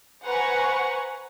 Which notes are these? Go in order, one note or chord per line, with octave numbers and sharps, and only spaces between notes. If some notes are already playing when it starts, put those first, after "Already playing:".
B4 C5 F#5 G#5 A#5 C#6